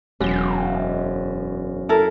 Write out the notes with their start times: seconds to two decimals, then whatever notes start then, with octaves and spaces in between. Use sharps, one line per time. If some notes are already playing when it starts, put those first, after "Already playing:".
0.20 E1 F#2
1.89 E4 A4 A#4